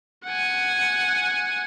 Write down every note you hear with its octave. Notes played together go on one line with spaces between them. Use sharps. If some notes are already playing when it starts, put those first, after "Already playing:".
F#5 G#5